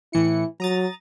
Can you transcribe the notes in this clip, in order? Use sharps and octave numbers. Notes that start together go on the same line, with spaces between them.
A2 E3 E4 C#7
F#3 A#5 D#6 A6